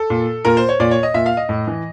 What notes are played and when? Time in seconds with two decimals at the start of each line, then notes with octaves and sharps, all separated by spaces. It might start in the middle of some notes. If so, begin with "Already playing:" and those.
Already playing: A4
0.10 A#2
0.45 A#2 A#4
0.57 C5
0.69 C#5
0.80 A#2 D5
0.91 C#5
1.03 D#5
1.14 A#2 E5
1.26 F5
1.37 D#5
1.49 A2
1.67 E3